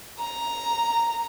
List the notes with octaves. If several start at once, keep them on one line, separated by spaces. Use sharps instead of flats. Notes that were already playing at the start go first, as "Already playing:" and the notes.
A#5